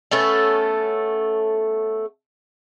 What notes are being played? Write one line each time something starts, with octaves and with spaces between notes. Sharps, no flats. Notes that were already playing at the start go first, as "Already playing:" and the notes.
A3 B3 C#4 A4